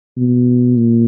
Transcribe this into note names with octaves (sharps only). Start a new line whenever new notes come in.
B2
A#2